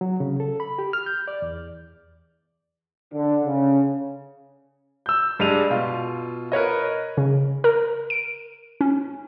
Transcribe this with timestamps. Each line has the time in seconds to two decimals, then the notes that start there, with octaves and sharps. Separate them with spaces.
0.01 F#3
0.20 C#3
0.40 A4
0.60 B5
0.79 G4
0.93 F6
1.06 G6
1.28 D5
1.42 E2
3.13 D3
3.45 C#3
5.06 E6 G6
5.39 G2 G3 G#3 D#5 D#7 F7
5.70 B2 F4
6.52 A#4 B4 C#5 D#5
7.17 C#3
7.64 A#4
8.10 D7
8.81 C#4